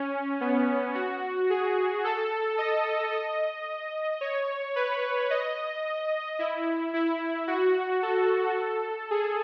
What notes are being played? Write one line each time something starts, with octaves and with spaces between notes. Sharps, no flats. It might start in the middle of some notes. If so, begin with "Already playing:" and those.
Already playing: C#4
B3
F#4
G#4
A4
D#5
D#5
C#5
B4
D#5
E4
E4
F#4
A4
G#4